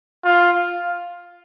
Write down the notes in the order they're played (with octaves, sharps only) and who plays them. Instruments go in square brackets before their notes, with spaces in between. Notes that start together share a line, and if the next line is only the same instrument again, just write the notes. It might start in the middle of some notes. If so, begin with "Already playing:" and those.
[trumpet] F4